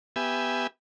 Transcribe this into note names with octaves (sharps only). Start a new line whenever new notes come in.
B3 G4 E5 G#5